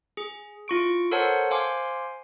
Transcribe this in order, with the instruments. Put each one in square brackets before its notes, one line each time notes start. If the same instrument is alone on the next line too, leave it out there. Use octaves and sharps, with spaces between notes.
[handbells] G#4
E4 F4 C#6 D7
A4 A#4 C5 C#5 F#5 A5
C5 F5 G#5 C6 D6